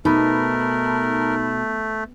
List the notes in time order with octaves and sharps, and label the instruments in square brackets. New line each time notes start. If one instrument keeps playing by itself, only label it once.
[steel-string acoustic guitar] B2 [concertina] A3 [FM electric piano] D#4 A5 B5 [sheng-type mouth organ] A#4